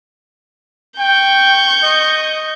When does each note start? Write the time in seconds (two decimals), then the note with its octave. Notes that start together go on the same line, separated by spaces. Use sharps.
0.99 G5 C#6 G6
1.83 D#5